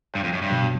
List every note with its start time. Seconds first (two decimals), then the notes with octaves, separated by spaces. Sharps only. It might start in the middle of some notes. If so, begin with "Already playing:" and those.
0.15 G2
0.24 F2
0.33 F#2
0.42 G2
0.50 B2 F#3